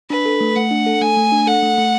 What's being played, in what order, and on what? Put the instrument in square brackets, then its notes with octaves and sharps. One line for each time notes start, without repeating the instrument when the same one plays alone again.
[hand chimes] D4 [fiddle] B4
[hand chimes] A4
A3
[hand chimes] A3 [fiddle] F#5
[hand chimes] D4
A4
[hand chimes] A3 [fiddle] G#5
[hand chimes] A3
D4
[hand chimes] A4 [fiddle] F#5
[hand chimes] A3
A3